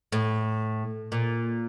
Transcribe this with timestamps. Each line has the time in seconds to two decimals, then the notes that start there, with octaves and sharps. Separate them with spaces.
0.12 A2
1.12 A#2